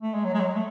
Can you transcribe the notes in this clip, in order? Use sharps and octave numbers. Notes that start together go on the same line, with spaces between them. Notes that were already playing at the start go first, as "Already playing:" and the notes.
A3
G#3
F#3
G#3
F#3
A3